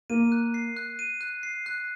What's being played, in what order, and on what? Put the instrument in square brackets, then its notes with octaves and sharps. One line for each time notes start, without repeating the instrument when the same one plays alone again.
[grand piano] A#3 [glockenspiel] D#7
[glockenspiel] F#6
C7
F#6
D#7
F#6
C7
F#6